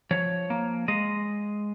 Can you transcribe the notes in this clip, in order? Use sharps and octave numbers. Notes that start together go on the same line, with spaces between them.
F3 C#5
A#3
G#3 D#5